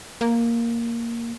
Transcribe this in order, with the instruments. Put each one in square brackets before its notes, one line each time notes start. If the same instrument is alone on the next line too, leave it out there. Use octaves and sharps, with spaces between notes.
[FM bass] A#3